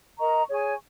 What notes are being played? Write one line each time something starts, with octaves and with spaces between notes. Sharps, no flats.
A#4 D#5 A#5 C#6
G#4 C#5 G#5 C#6